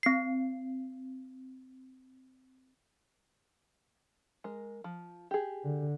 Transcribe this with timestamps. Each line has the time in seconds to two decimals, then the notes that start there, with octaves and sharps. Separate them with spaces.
0.03 C4 C7
4.44 G#3 A#4
4.84 F3
5.31 G4 G#4
5.64 D3